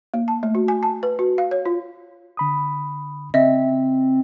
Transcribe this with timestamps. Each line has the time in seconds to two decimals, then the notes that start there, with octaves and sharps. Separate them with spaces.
0.14 A#3
0.28 A5
0.43 A3
0.55 F#4
0.68 G#5
0.83 A5
1.03 B4
1.19 F#4
1.38 F5
1.51 C#5
1.66 F4
2.37 D3 B5 D#6
3.34 C#3 C4 D#5 E5